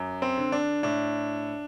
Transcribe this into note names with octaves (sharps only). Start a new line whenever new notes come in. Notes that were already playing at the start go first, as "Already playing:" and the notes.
Already playing: F#2
C4
D3
D4
A2 D4